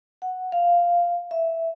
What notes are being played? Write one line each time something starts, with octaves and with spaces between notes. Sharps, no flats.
F#5
F5
E5